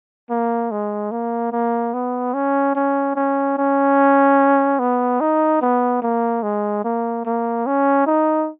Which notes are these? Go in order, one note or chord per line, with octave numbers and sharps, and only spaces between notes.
A#3
G#3
A#3
A#3
B3
C#4
C#4
C#4
C#4
B3
D#4
B3
A#3
G#3
A#3
A#3
C#4
D#4